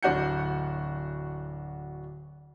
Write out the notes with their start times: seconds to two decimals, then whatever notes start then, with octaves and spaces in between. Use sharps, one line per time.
0.03 D1 D4 F#4 F#5 G6 C#7